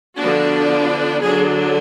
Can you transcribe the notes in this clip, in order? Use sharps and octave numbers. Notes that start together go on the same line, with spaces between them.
D3 F3 B3 D4 F#4
D3 F#3 D4 G#4